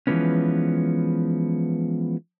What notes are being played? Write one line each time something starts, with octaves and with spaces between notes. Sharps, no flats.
E3 F3 G#3 B3 C#4